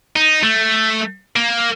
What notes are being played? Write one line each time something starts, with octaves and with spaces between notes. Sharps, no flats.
D#4
A3
A#3